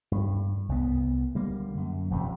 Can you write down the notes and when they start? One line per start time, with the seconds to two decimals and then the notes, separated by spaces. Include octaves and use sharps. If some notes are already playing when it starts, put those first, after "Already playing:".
0.12 G2
0.69 C2 B3
1.35 D3 G3 A#3
1.77 F#2
2.11 D#1 F2 C3